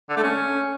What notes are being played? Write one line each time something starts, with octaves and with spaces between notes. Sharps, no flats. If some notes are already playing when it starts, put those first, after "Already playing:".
D3
A3
C#4